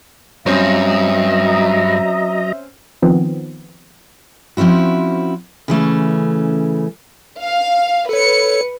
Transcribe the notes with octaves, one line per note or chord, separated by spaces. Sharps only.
G2 F#3 C4 C#4 C5 D#5 E5 A#5
D#3 F3 B3 C4
F3 C4 C#4 E4 F#4
C#3 E3 A3 C#4
F5
A4 B4 C#5 C#7